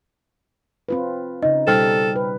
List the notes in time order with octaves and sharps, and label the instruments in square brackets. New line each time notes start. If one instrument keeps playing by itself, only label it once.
[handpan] C4 F4 B4
[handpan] C#3 D#4 [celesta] D#5
[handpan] B2 G3 D#4 [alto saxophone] A4 [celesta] C5 G5 F6
[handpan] B4